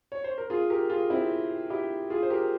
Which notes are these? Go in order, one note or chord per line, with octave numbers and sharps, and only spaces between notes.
C#5
C5
A#4
F4 G#4
G4 A#4
F4 G#4
C4 E4
E4 G4
F4 G#4
C5
G4 A#4